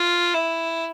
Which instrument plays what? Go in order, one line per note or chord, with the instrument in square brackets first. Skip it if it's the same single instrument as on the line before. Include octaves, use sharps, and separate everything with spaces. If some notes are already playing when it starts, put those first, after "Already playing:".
Already playing: [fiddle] F4
E4